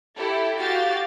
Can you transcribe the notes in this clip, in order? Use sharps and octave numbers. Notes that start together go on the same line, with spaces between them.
E4 G4 A4
F#4 G4 F5 A6